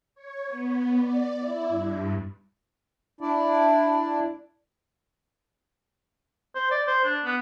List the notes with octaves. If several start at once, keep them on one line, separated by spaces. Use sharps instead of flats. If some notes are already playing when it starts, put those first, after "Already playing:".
C#5
B3
D5
E4
G2
D4 E4 D5
C5
D5
C5
D4
B3